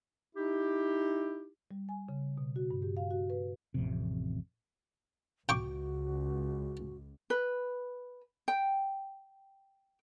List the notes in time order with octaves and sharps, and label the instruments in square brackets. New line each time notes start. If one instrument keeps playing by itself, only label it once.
[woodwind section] D#4 E4 G4
[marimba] G3
G#5
C#3
B2
F#4
G2
G4
F5
F#4
B4
[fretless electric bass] A1 F2 C3
[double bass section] C#2 [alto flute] F#4 [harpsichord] G5 C#6 D6
[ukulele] B4
G5